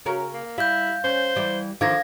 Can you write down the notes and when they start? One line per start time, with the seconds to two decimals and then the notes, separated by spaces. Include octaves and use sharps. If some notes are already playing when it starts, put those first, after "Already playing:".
0.06 C#3 C#4 F#4 A#4
0.34 A#3
0.58 G3 E4 F5 G6
1.04 C#4 C5
1.36 E3 G3
1.81 D3 D#3 F3 A3 F5 G#6 A#6